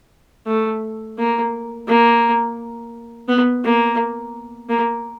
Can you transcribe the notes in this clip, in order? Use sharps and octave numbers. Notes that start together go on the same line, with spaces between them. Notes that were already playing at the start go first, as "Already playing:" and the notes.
A3
A#3
A#3
B3
A#3
A#3